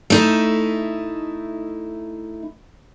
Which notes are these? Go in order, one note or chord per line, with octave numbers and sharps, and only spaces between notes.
A3 D#4 E4